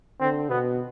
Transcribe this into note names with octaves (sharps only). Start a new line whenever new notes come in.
D3 C4
B2 B3